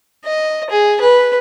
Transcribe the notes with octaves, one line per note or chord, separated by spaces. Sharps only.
D#5
G#4
B4